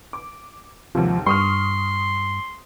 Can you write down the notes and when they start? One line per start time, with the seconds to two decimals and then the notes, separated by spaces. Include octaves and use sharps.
0.13 D6
0.95 D#2 G#2 C3 F3
1.27 G2 C6 C#6 D#6 F6